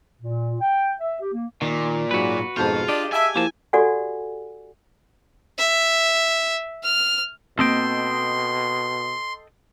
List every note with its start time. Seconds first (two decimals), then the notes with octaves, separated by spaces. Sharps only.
0.22 A#2
0.61 G5
1.00 E5
1.21 G4
1.34 A#3
1.62 A#2 D#3
2.11 G#2 F#3 F#4 B4
2.57 F2 G#2 B2 F4 G#4 A5 G6
2.88 D4 G4 D#5
3.12 E5 F5 G#5 A5
3.36 F3 A#3 E4 G4 A5
3.73 F#4 G4 A4 D5 F#5 G#5
5.58 E5
6.83 F6
7.59 B2 A#3 C4 A4 D#5 G5 C6